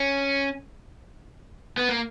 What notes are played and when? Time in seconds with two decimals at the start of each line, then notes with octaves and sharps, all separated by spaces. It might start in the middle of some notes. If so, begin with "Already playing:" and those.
Already playing: C#4
1.78 B3
1.89 A#3